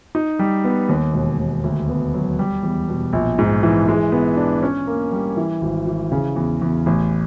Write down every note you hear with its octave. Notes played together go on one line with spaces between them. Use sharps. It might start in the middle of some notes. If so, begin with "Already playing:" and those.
D#4
G3
B3
D#2
E1
D#2
D2
B3
F#3
G3
E2
B2
A#1
G#2
E3
G#3
B3
D4
C#4
A#3
G3
E3
G#1
E3
C#3
E2
E2
A1